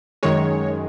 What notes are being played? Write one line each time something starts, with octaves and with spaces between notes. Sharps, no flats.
F#2 D#3 G#3 C#5